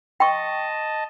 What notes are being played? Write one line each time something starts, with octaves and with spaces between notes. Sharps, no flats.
D#5 G5 A5 C#6